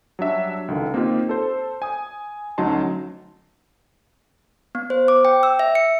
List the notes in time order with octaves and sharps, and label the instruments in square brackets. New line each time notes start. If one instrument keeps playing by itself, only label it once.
[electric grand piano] F#3 G3 D4 E5
C#2 D3 D#3
A#3 C4 D#4 F4 G4
A4 C5
G#5 D#6
D2 F#3 C#4 D#4 A5 C6
[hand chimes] B3
C5
D6
G5
E6
E5
C#7